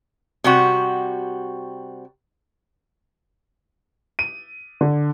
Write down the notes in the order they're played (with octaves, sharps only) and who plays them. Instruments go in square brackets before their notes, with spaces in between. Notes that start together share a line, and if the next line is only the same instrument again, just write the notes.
[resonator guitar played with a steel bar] C3 G3 F#4
[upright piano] D#7
D3